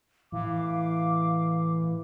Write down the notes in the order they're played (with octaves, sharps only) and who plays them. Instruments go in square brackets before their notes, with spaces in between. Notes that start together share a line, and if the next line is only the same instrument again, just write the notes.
[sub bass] A2 [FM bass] E3 [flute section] F5 D6